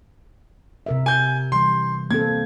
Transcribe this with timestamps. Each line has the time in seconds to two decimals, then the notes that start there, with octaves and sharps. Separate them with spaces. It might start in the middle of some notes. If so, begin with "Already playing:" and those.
0.86 C3 A#4 E5
1.06 G#5 G6
1.52 E3 G3 C6
2.11 A#3 C4 A4 G#6